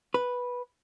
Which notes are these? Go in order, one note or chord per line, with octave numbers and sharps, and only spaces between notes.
B4